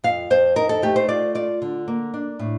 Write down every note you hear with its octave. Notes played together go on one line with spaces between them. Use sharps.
F2 F5
F2 C5
D#4 A#4
A4
A3 G4
C5
F4 D5
F4 D5
D3
A#3
D4
A2